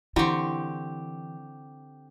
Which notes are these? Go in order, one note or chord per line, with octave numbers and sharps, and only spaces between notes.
D3 E3 C4 E4 G4 C#6